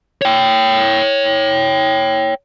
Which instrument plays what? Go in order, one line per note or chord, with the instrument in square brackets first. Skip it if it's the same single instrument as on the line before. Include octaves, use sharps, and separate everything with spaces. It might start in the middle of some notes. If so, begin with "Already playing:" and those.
[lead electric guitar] C#5 G5